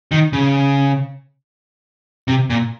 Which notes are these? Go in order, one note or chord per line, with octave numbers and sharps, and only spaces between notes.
D#3
C#3
C3
A#2